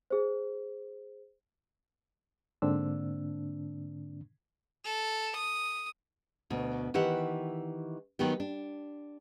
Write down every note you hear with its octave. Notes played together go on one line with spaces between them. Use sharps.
G#4 C5
G#2 D3 A#3 C4 D4 E6
A4
D#6
D2 B2
D#3 E3 G4 E5 F#5
D#3 F#3 B3 G4
D4